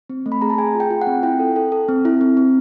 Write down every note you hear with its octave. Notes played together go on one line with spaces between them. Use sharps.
C4
A3
B5
G#4 A#5
A5
G#4 G#5
F4
G5
F4
F#5
C4
E4 G5
A4
A4
A4
C4
E4
C4
C4